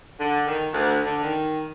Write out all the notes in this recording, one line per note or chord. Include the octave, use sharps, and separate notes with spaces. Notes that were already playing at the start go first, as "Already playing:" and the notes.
D3
D#3
D2
D3
D#3